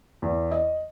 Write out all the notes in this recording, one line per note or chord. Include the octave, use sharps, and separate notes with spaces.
E2
D#5